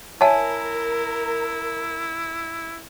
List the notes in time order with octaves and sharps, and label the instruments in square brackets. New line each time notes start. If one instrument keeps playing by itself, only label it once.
[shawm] E4 [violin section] A#4 [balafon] C#5 E5 [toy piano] G#5 A5